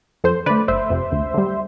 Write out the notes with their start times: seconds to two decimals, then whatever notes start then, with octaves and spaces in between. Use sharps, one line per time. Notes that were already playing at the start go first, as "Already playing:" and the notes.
0.24 F2 A4 C5
0.46 D3 A3 B4 D5
0.68 G1 C5 E5
0.90 F2 C3
1.12 D2
1.34 D3 G3